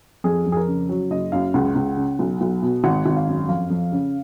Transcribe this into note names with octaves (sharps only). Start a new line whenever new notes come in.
F2 G#4
F2
G#4
A#4
C#3
F#3
F#1 D#5
F#2 F5
C#2 F#5
C#2
C#3
B1
B1
B2
G#1 F#5
G#1
F5
F#2
F2 F5
F2
C#3